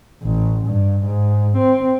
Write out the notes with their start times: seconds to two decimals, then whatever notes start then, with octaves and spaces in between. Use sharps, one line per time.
0.23 A1
0.67 G2
1.05 G#2
1.57 C4